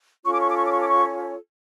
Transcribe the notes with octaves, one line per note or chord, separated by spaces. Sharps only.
C#4 F4 A4 C#5 C#6
D6
C#6
D6
C#6
D6
C#6
D6
C#6